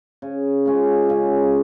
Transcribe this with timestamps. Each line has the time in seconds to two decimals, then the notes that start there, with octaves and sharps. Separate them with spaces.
0.22 C#3
0.66 G#3 C#4 F4
1.10 C#3